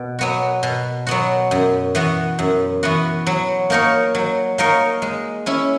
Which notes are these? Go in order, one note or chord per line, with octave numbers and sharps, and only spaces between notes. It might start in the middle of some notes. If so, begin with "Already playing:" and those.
Already playing: B2
F#3 B3 F#4
B2
F#3 B3 F#4
F#2
E3 B3 F#4
F#2
E3 B3 F#4
F#3
A#3 D#4 A#4 C#5
F#3
A#3 D#4 A#4 C#5
G#3
C#4 E4